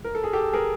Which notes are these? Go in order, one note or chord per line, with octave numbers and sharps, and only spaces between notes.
A#4
A4
G#4
G4 A4
G#4 A#4